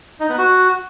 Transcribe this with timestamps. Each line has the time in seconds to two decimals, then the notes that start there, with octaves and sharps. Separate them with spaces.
0.20 D#4
0.29 B3
0.38 F#4